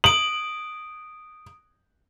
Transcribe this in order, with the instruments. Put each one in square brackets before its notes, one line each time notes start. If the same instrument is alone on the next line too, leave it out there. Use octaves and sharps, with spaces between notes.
[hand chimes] D#6 D7 [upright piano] F#7